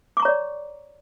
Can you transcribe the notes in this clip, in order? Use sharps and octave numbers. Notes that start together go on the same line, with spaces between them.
C#5 D5 A#5 C#6 D6